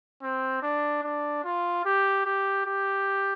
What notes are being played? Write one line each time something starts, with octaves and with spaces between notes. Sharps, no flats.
C4
D4
D4
F4
G4
G4
G4